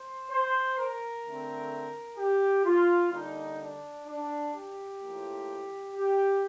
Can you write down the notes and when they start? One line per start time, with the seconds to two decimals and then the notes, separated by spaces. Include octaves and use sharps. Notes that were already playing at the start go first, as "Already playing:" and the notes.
Already playing: C5
0.31 C5
0.77 A#4
1.24 D3 A3 C4
2.18 G4
2.65 F4
3.12 D3 G3 A#3 D4 D#4
3.59 D4
4.07 D4
4.53 G4
5.01 A2 F3 A#3
5.95 G4